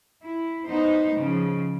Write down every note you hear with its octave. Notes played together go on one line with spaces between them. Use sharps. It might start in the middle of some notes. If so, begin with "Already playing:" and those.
E4
B3 D#4 C5
C#3 F3